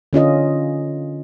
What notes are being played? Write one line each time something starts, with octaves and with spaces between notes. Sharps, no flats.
D3 C#4 F4 D#5